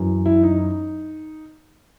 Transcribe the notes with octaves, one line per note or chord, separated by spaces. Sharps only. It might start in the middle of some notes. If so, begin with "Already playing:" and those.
Already playing: F#2 E3
E4
D#4